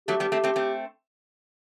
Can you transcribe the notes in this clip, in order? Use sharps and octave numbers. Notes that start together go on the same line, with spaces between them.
F#3 A3 G4
G3 B3
A3 C4
A3 C4
A3 C4